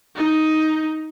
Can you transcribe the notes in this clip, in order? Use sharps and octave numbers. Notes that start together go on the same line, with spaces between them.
D#4